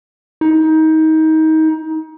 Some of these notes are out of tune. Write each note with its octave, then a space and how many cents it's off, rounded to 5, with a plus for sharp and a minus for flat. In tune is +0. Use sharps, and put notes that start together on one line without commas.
D#4 +25